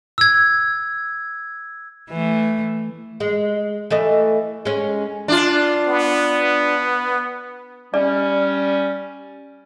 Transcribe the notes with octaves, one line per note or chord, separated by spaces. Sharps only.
E6 G#6
E3 A3
G#3
E3 A3 D#5
G#3 C#4
D4 F4
B3
G3 C#4 D5